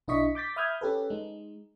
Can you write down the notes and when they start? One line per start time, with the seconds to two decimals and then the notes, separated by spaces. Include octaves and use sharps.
0.08 B1 D4 E4 D#5 C#6 B6
0.35 D6 G6 A6 B6
0.56 E5 B5 D#6 F6 G6 G#6
0.81 C#4 G4 A4 B4
1.10 G#3 D#4